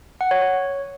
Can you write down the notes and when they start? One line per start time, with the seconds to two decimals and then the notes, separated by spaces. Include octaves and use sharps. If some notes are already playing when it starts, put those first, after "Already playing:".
0.21 F#5
0.31 C#5
0.42 C#5